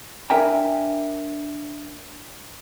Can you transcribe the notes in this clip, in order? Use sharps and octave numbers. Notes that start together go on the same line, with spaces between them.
D4 A#4 E5 G5 G#5 A#5